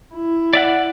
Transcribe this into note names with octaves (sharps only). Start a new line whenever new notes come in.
E4
D5 E5 F#5